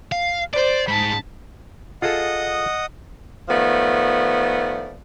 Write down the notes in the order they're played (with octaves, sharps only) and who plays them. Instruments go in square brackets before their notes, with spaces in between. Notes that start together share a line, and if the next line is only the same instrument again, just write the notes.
[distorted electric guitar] F5
[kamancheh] C5 [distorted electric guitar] D5
[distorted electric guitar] G#2 [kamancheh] A5 B5
[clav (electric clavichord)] F4 G#4 A4 [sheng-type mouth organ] D#5 F#5 D#6
[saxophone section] D#3 F3 A3 B3 D5